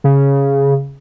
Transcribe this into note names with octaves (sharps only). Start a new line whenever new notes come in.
C#3